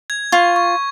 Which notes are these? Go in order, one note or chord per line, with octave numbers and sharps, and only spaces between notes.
G#6
F4 C#6
C#6